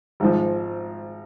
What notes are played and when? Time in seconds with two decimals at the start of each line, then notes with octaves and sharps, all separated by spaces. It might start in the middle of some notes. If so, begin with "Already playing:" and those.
0.20 G#1 G#2 F3